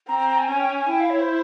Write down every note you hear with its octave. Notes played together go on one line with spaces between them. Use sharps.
C4 A#5
A#5
A#5
G#5
C#4 G#5
G5
G#5
G#5
E4 G5
F5
C#5
C5